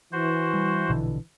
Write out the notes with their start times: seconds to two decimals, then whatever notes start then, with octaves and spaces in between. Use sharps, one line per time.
0.13 E3 F#4 C5
0.54 G3
0.89 A#1 B2 D3